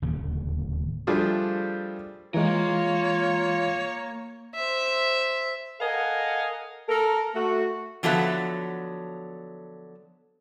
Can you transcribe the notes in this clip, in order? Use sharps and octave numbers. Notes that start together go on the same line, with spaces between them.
D1 D#2 C#3
F3 G3 A3 D4 F4 G#4
E3 G#3 A#3 F4 A#4 C#5
C5 E5
A4 A#4 D#5 F5 F#5 G#5
A4 A#4
A3 F#4
D3 F3 F#3 B3 A4 E5